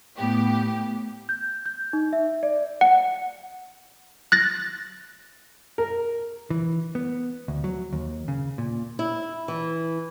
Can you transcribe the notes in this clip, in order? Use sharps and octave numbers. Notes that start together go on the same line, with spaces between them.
A2 B3 G4
G6
G6
D#4
E5
D5
F#5
F#6 A6 A#6
A#4
E3
B3
D2
F#3
D#2
C#3
A#2
E4
E3